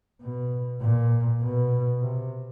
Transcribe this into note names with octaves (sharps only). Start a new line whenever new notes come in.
B2
A#2
B2
C3